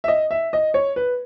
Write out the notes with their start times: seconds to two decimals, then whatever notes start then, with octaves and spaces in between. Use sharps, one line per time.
0.04 E5
0.08 D#5
0.31 E5
0.53 D#5
0.74 C#5
0.96 B4